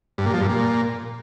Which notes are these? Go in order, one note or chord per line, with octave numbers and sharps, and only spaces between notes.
G2
A#2
F3
G2
A#2